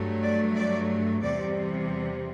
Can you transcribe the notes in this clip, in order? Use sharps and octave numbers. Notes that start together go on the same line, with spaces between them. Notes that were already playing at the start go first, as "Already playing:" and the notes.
Already playing: G2 F#3 A3
D5
D5
E2 C3 G3 D5